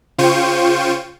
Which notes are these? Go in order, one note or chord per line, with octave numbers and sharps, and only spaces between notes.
C#3 F4 C5 G5 C#6 D#7